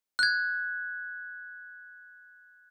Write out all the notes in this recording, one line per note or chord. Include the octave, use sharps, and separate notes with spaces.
F#6 G#6